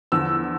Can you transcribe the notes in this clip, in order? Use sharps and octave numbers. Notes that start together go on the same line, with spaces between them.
E2 D3 F3 E6